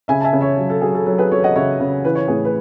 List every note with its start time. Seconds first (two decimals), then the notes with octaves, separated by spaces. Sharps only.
0.08 C#3 E5 G#5
0.21 A5
0.24 E5 G#5
0.33 C#3
0.41 C#5 E5
0.57 F#3
0.70 A4
0.82 F#3 G#4
0.95 A4
1.06 F#3 A4
1.18 G#4 B4
1.31 F#3 A4 C#5
1.44 D#5 F#5
1.56 C#3 C#5 E5
1.80 C#3
2.04 E3 B4
2.15 C#5
2.27 A2 G#4 B4
2.45 B4